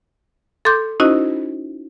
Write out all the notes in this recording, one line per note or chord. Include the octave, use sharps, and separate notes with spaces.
A4 C6 D6 G6
C#4 D#4 E4 F#4 C5 D#5